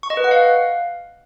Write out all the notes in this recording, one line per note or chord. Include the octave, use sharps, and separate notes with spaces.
C#6
D#5
B4
F#5
F5